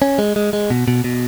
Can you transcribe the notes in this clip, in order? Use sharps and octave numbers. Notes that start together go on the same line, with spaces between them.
C#4
G#3
G#3
G#3
B2
B2
B2